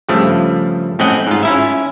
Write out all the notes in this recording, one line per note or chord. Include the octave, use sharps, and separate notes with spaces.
G2 C#3 F3 A3
A2 C4 C#4 D#5 F#5 G5
G#2 F4
C#4 E4 E5